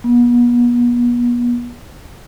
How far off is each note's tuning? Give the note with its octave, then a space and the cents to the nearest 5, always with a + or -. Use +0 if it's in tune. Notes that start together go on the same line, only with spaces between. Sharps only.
B3 -40